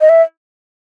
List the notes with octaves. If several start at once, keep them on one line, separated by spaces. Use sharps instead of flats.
D#5
E5